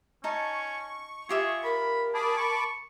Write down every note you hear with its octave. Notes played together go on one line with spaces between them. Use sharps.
C#4 D#4 A5 C#6
F4 G4 G#4 E5
A#4 B5
G#4 A5 B5 D6
C#6